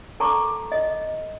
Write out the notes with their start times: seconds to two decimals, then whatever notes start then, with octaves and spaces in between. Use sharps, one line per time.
0.20 A4 A5 A#5 C#6 D6
0.72 D#5